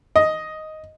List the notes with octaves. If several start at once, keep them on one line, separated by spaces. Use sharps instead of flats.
D#5